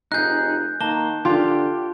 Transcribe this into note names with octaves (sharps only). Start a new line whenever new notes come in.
F1 D#4 G#4 F#6 G6
D#3 A#3 A5 G7
D3 F4 G4